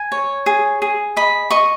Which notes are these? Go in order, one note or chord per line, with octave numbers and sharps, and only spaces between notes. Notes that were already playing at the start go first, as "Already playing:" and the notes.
Already playing: G#5
C#5
G#4
G#4
D#5 B5
D#5 C#6